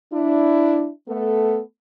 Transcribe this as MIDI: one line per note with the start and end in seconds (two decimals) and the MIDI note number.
0.13 0.90 62
0.13 0.90 64
1.09 1.60 57
1.09 1.60 59
1.09 1.60 69